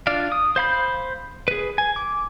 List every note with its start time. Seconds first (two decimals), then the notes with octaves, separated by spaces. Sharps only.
0.07 D4 F4 D5 F5
0.32 D#6
0.56 C5 F5 B5 G6
1.48 G#4 B4
1.78 G#5
1.96 D6